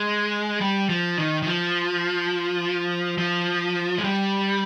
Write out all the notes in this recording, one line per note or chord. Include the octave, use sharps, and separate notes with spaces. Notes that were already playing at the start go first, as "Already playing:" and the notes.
Already playing: G#3
G3
F3
D#3
D#3
F3
F3
G#3
G3